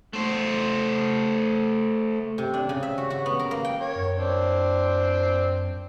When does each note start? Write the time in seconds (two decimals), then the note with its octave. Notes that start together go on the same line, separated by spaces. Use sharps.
0.13 A3 C5
2.38 C3
2.54 D4
2.69 C#3
2.83 E5
2.98 F#4
3.10 F#4
3.26 B3
3.39 A#4
3.51 A#3
3.65 G5
3.80 A#4 C#5
3.95 F#2
4.16 C4 D4